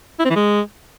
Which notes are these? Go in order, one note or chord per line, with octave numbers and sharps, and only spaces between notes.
E4
C4
E3
G#3